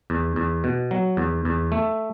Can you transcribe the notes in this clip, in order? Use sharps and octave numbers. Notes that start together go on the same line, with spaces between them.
E2
E2
B2
F#3
E2
E2
A3